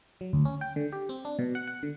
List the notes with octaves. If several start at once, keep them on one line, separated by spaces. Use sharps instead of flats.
F#3
D2
C#4
G5
D3
G4
C4
D4
B2
F#5
F#5
D3